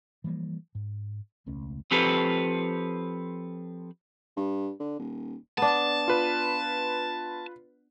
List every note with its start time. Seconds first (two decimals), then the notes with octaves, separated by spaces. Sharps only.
0.24 E3 F3 G3 A#3
0.75 G#2
1.46 E1 C#2 A3 C#4
1.91 F3 C4 G4 A4 B4
4.37 G2
4.80 D3
4.99 D#1
5.58 B3 D4 A5
6.08 F4 B4